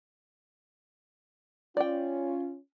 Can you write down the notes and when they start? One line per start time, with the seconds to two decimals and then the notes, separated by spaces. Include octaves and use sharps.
1.77 C#4 F4 D5 G5